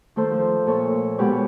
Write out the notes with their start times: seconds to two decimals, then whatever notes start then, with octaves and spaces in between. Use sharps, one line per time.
0.16 D#3 A3 A4 C5
0.31 F3
0.66 A#2 A4 C#5
1.18 B2 G#3 G4 B4 C#5